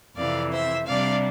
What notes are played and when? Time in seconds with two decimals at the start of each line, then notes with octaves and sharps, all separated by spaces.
0.16 F2 C3 E3 D5 F5
0.52 C5 E5
0.87 C3 G3 D4 D5 F5